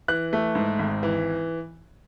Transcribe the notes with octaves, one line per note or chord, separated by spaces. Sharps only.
E3 F#6
A3
G#2
G#1
E3